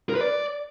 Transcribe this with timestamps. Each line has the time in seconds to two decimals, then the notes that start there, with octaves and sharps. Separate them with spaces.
0.09 A#4
0.15 B4
0.21 D5